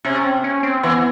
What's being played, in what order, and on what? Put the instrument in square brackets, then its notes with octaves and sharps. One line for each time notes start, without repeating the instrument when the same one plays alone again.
[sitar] C3 [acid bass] C#4
[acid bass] C4
C#4
C4
[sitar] E3 [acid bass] B3